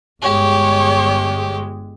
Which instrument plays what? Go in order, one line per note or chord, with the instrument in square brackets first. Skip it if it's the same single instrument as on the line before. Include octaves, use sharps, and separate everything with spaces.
[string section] G1 G#3 [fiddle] G4 [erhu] C#5